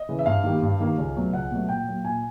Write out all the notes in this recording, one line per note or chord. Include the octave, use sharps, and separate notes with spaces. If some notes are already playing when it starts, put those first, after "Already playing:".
Already playing: D#5
C#3 E3
E5
G2 F5
D#3 G3 A#3
G2
D#3 G3 A#3
C#2
B2 F#3 A3
C#2 F#5
B2 F#3 A3
A#2 G5
F#3 A#3
A#2 G#5